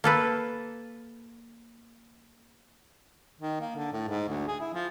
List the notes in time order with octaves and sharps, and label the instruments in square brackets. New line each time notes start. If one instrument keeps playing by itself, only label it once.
[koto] A#3 A4 B4
[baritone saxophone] D#3
A#3
D3
A2
G#2
D2
G#4
E4
F3